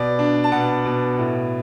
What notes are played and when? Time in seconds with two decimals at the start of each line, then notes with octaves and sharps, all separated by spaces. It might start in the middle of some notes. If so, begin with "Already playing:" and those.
Already playing: B2 D5
0.19 D4
0.44 A5
0.51 B2 F#5
0.85 B2
1.18 A2